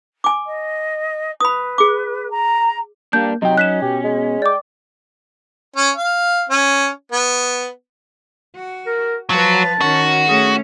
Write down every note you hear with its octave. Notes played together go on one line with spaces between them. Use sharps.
G#5 D6
D#5
B4 B5 D#6
G#4 D6
A#5
G3 A#3 D4 G6
C3 F#3 D#4 G5
C#4 F#6 B6 E7
B2 G4
G#3
D5 G5 D6
C#4
F5
C#4
B3
F#4
A#4
F3 F#3 B4 A5
D#3 C#4 F#4
A3 C#4 G#4